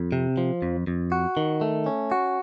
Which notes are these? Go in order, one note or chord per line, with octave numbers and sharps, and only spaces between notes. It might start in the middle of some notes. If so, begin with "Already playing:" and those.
Already playing: F2
C3
F3
F2
F2
F#4
D#3
A3
C#4
F#4